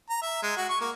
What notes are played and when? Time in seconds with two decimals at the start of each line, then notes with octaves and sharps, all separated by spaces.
0.09 A#5
0.22 E5
0.43 G#3
0.57 F#4
0.69 C#6
0.81 A#3